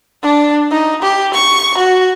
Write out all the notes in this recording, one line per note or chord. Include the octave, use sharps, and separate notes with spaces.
D4
D#4
G4
C#6
F#4